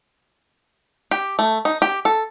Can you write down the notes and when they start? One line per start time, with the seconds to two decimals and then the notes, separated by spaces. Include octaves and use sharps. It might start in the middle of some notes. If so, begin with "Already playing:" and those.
1.11 G4
1.39 A3
1.65 D#4
1.82 G4
2.05 A4